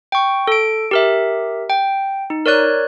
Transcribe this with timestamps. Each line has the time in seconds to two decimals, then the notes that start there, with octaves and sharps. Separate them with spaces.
0.12 G5 C#6
0.47 A4 D7
0.91 G4 A#4 E5
1.70 G5
2.30 D#4
2.46 A#4 C#5 D5 F#6